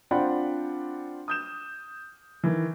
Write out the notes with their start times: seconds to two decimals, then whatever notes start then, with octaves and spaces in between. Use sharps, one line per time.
0.11 C4 D4 F4 F#5 G5 B5
1.28 D#6 G6 E7
2.44 D#3 E3